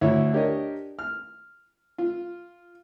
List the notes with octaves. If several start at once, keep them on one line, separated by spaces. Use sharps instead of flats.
D2 E4 C#5
D4 G4 A#4 C#5 D#5
F6
F4